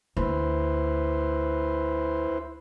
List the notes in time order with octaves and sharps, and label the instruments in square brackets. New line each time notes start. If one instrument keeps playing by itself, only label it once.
[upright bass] D2 [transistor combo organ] E4 B4 C5